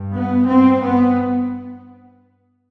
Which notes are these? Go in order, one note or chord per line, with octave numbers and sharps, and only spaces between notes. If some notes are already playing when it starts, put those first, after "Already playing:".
Already playing: G2
B3
G2 C4
B3